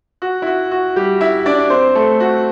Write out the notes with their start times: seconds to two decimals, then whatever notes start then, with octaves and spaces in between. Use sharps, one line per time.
0.22 F#4
0.42 E4
0.47 F#4
0.71 F#4
0.96 G3 G4
1.21 E4 E5
1.46 D4 D5
1.70 C4 C5
1.95 A3 A4
2.20 F#4